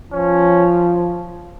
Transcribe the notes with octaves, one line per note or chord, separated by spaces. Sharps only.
F3 C#4